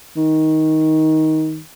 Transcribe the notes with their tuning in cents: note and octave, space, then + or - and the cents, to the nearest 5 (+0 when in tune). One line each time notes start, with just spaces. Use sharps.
D#3 +15